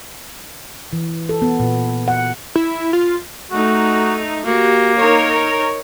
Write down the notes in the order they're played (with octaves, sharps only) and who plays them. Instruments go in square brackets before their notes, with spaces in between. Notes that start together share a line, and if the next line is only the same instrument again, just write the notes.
[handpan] E3
A4
B3
A#2
F#5
[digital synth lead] E4
F4
[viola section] A3 D#4 [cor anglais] F#4
[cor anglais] A#3 [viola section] F#4 G4
[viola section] D#4 A#4 C#5